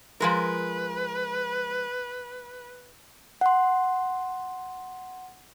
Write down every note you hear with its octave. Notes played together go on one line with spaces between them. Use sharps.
F3 G#3 A#4 B4
F#5 C6